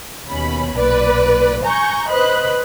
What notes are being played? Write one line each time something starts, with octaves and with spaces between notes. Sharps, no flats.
D#2 B2 C#4 B5
B1 A#2 B4 D5
G#5 A#5 C#6 G6
B4 C5 D#5 B5 F#6